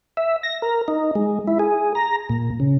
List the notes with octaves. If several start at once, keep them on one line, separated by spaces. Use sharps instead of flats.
E5
A#6
A#4
D#4
G#3
E4
G#4
A#5
A#2
C#3